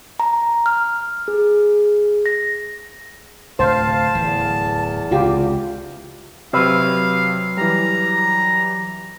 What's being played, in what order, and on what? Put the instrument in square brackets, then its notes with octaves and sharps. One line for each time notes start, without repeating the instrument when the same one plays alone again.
[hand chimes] A#5
F6
G#4
A#6
[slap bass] D1 D2 C3 [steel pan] C5 [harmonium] F5 [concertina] A5
[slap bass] D1 E3 [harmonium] E2
[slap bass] C#2 C3 [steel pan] F4 G4
[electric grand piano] C3 E6 [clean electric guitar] F#3 B4 [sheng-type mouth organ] F5
[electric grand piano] E3 G3 [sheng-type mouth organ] A#5